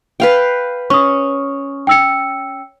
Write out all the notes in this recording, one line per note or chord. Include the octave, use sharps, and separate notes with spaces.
B4 F5 G5
C#4 C#6 D#6
G5 E6 C#7